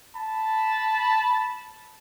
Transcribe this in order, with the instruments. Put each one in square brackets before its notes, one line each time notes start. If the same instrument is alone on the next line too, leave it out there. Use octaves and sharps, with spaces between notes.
[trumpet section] A5 B5